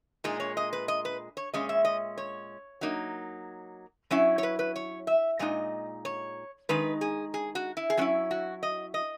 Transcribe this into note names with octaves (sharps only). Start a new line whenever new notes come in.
A#2 G#3 D#4
C#5
D#5
B4
D#5
B4
C#5
A#2 G#3 C#4 D#5
E5
D#5
C#5
F#3 A#3 D#4
F#3 C#4 E4
C#5
B4
B4
C#5
E5
A#2 G#3 D#4 D#5
C#5
D#3 G#3 D#4 B4
G#4
G#4
F#4
E4
G#4
F#3 C#4 E4 F#4
F#4
D#5
D#5